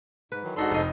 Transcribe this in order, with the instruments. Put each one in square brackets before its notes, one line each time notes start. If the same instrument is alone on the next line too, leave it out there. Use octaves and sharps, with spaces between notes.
[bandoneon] G#2 [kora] B4
[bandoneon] D#3 E3 F#3
[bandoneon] G#2 A4 C6 [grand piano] D4 D#4 F#4
[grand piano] F1 D#4 [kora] C5 D#5